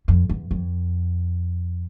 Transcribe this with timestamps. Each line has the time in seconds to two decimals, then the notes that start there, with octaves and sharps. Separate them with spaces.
0.08 F2
0.29 E2
0.51 F2